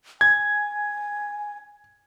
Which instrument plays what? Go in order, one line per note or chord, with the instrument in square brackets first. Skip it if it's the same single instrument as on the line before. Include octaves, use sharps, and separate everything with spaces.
[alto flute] G#5 [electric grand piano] G#6